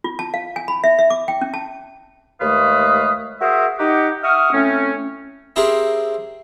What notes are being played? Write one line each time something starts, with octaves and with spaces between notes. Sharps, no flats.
F4
A5
F5
G#5
B5
E5
E5
D6
G5
C#4
A5
D#2 G#3 A3 B4 F5 D#6
F#4 G#4 A#4 C5 E5
D#4 G4 F#5
E5 F#5 C#6 D#6 F6
A2 A3 C4 C#4
C4 E4 G4 G#4 A#4